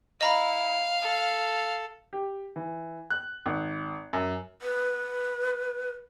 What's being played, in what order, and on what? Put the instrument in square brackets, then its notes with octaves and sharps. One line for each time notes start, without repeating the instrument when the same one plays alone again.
[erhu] E4 [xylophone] D#5 A#5 B5 [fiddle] F5
[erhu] A4
[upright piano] G4
E3
F#6
G#1
F#2
[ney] B4